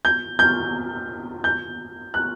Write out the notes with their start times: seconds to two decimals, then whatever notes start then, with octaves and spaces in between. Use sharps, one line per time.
0.05 G6
0.39 G6
1.44 G6
2.14 F#6